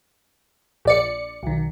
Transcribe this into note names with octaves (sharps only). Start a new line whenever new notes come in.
A#1 D5 C#7
B1 D#3